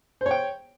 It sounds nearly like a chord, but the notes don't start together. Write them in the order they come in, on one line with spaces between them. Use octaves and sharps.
C5 C#5 G5